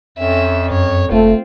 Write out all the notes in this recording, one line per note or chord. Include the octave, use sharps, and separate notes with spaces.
F2 C#4 E5
F#2 C#5
F#1 A3 C4 F4